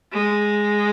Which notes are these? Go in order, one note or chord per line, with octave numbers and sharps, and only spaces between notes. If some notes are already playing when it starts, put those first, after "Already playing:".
G#3